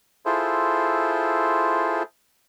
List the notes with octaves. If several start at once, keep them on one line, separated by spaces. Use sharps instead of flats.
E4 F4 G#4 A4 C5